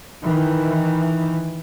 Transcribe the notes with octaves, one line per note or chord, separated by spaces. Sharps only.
D#3 E3